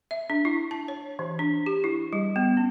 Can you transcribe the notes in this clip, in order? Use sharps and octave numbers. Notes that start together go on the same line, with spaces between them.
E5
D4
E4
A5
C#5
E3
D4
G4
E4
G3
B3
C#4